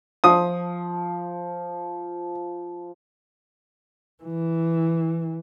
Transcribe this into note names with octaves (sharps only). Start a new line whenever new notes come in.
F3 D#6
E3